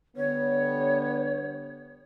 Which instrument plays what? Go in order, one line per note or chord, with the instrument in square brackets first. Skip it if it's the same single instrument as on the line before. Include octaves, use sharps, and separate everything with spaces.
[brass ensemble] D3 G3 B3 [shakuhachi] C#5